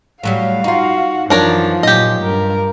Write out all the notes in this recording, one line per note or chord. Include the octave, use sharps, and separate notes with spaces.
A2 F#3 G3 F5
D#4 F4 F#4
F#2 E3 F3 D4 A#4 C#5
A#2 F#3 G4 D#5
G2 A#4